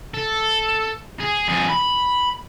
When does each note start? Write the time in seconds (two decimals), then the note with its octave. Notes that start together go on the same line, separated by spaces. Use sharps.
0.14 A4
1.20 G#4
1.48 F2 G#4
1.70 B5